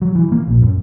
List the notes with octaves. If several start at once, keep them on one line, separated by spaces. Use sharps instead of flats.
F#3
E3
A#3
A#1
F#2